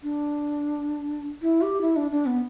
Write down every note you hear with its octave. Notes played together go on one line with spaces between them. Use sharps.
D4
E4
G4
E4
D4
D4
B3